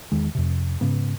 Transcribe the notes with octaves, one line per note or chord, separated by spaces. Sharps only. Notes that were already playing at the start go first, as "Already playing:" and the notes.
E2 D#3 G#3
F2 C3
G#2 C#3 B3